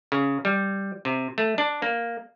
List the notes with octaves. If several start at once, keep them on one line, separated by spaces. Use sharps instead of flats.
C#3
G3
C3
A3
D4
A#3